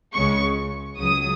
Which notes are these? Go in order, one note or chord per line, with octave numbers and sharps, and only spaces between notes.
C#2 C#3 G#3 C#6
C#2 C#3 F#3 D#6